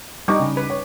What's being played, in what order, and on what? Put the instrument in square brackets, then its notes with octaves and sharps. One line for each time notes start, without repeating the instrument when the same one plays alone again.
[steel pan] G3 D#4 [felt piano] D#5 C#6 D6
[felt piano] C#3
[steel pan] B4
[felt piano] C#5